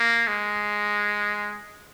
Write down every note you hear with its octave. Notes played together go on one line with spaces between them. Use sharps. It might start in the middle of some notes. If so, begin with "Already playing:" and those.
Already playing: A#3
G#3